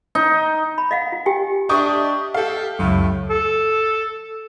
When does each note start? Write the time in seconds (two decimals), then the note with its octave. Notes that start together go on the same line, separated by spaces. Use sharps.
0.15 D#4
0.78 B5
0.91 D#5 F5 F#5
1.12 F4
1.26 G4 G5 G#5
1.69 D4 G4 D#5 E5 C#6 D#6
2.34 G4 A4 F5
2.79 C#2 F#2 A2
3.30 A4